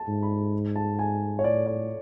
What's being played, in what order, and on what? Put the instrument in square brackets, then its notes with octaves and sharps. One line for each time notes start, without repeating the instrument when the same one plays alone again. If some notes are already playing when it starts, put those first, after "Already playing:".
Already playing: [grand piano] A5
[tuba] G#2
[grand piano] B5
A5
G#5
C#5
[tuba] A2 [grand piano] D5
[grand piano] D5